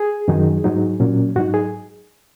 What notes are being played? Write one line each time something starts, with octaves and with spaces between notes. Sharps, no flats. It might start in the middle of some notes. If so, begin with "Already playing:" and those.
Already playing: G#4
F#2 D#3 F#3 D#4
G#2 F#3 D#4
A#2 F#3 C#4
G#2 F#3 D#4 F#4
G#4